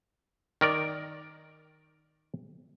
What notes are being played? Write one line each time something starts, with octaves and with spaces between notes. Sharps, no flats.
D#3 A#4 D5